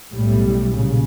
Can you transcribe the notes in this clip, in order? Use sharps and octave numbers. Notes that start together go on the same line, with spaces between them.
B1 A2 G3
A#2 C#3